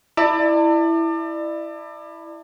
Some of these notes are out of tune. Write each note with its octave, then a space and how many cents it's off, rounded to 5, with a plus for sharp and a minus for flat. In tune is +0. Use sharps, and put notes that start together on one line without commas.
E4 +0 D5 +30 A5 +40